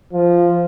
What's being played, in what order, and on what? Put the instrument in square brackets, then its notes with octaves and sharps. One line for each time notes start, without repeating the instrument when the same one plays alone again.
[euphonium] F3